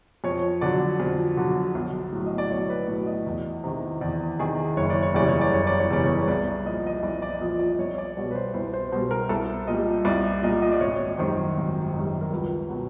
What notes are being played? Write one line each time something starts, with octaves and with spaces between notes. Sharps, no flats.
F2 C#5
D3 F#3 D5
F2
D3 F#3
B1
A2 F#3
D#5
D5
B1 C#5
B4
A2 F#3 D5
D#5
E2
C3 D#3
E2 D5
C3 D#3 G#4
F#1 C#5
D5
C#5
E2 C#3 E3 G3 D5
C#5
D5
F#1 C#5
D5
C#5
E2 C#3 E3 G3 D5
C#5
C2 D5
A#2 F3 D#5
D#5
C2 D5
D5
A#2 F3 D#5
D5
C2 C#5
D5
B2 G3 C#5
B4
C5
C2 C5
C5
B2 G3 C5
A#4
C2 A4
A#2 G3 D#5
C2 D5
A#2 G3 D#5
D#5
D5
G#1 C#5
F#2 D#3 G3 C5
G#1
F#2 D#3 G3
A#4
C#2 B4
B2 F#3